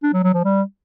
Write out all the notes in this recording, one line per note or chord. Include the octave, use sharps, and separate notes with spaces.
D4
F#3
F#3
F3
G3